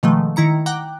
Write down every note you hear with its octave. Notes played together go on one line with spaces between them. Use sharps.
B2 D#3 F3 G#3 A3
D#3 E4 A#5 C#7
F#5 G5 A#5 D6 F#6